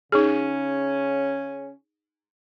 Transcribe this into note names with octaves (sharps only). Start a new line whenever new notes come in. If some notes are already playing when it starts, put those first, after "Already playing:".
C#3 C#4 D#4 G#4